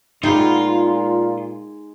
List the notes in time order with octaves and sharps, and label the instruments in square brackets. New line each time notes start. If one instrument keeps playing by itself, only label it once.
[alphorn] A#2 [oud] G#3 B3 G4 [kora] D#4 [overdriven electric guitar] F4 C6